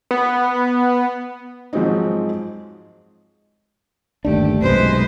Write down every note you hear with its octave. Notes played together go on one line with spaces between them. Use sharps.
B3
G#2 F3 F#3 G#3 C4 D#4
G1 D#2 A3 D4 G4
B1 F#2 C3 G#3 B4 C5